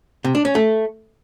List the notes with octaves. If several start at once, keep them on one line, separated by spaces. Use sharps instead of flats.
C3
D4
C#4
A3